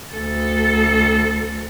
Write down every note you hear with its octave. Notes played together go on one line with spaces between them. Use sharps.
D2 A4